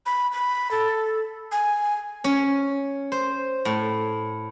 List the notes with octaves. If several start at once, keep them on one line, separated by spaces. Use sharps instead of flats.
B5
B5
A4
G#5
C#4
C5
A2